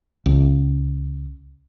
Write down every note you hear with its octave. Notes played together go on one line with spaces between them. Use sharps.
C#2